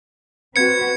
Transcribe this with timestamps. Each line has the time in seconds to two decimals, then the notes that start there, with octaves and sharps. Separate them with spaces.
0.56 C4 F#4 B4 G#6 C#7